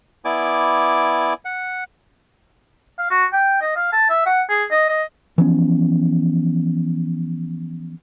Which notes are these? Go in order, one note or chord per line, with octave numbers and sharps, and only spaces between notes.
B3 E4 D5 G#5 D6
F#5
F5
F#4
G5
D#5
F5
A5
E5
F#5
G#4
D#5
D#5
E3 F3 B3 C#4